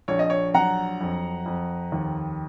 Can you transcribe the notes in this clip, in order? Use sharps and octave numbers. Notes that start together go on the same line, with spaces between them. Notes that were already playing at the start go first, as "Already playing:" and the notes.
A#1 C#5
D#5
C#5
F#3 F#5 A#5
F2
F2
D#2